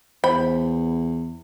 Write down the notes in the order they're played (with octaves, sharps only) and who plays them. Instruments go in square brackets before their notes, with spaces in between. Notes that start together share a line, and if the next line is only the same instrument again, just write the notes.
[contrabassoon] E2 [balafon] C5 [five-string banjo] B5